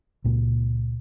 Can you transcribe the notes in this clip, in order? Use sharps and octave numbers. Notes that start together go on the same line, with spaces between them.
C#2 A#2 A#3